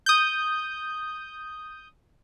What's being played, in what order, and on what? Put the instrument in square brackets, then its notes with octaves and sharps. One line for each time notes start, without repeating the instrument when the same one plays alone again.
[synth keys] D#6 G6